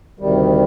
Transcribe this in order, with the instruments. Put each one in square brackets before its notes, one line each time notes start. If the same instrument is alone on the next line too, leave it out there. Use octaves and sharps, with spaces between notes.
[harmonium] D2 C3 D#3 G3